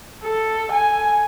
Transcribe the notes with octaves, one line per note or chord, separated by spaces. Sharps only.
A4
G#5